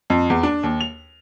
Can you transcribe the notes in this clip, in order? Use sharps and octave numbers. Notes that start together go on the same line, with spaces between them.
F2
E2
D4
D#2
F7